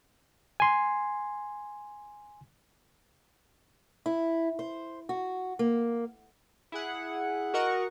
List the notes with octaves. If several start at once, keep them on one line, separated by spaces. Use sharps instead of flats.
G#5 C6
E4
C5
F#4
A#3
E4 G#4 F#5
F#4 A#4 D#5 F#5 C#6